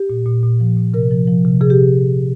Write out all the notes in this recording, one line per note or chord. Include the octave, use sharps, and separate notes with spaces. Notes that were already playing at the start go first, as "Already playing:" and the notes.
Already playing: G4
A#2
A#2
A#2
F3
A#2
C3 A#4
F3
F3
C3
C3 G#4
G4